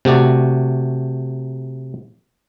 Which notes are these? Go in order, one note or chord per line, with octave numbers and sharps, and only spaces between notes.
C3 A3 F#4 D5